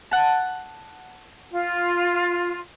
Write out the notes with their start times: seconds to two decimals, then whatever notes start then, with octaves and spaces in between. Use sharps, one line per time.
0.11 F#5 A5
1.51 F4